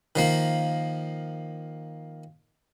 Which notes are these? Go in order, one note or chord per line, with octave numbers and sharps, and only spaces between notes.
D#3 F3 A#3